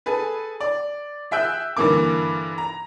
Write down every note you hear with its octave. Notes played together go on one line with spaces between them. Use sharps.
G#4 A4 B4
D5
G#4 E5 G5 E6 F#6
G2 D3 E3 A#3 D6
A#5